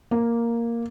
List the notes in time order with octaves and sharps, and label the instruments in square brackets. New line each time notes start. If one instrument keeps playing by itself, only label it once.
[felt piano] A#3